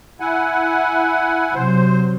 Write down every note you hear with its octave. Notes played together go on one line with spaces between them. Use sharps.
E4 F#5 G#5
C3 F#3 C5